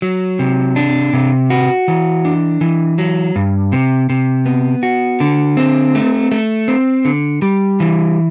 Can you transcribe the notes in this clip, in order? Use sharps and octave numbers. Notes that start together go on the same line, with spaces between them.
F#3
C3
D4
C3
F#4
E3
D4
E3
F#3
G2
C3
C3
B3
F#4
D3
C4
A3
A3
C4
D3
G3
E3